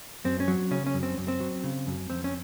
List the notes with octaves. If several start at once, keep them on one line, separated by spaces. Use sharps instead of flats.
F#2 C4
C#4
F#3
C#3 C#4
C#4
F#2
C4
F#2
C4
F#3
C#3
F#2
F2 C4
C#4